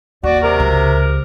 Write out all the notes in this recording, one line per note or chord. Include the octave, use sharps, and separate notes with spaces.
D#2 F#4 D5
C3 A#4
C#2